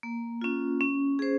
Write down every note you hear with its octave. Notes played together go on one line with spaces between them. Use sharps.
A#3
C#4 F4
C#4
G#4 C5